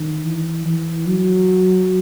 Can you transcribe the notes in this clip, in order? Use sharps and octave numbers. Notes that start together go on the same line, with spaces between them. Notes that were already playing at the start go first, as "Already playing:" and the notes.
Already playing: D#3
E3
E3
F#3